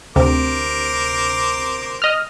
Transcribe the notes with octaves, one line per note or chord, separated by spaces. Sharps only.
D2 C3 A#4 C5 D6
D#5 F6